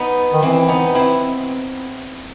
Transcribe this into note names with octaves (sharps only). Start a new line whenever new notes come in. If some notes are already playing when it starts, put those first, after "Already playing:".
Already playing: B3 D#4
D#3
E3 C4 E4
B3 D#4
C4 E4